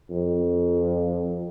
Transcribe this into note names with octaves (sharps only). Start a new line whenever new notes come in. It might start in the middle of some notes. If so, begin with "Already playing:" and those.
F2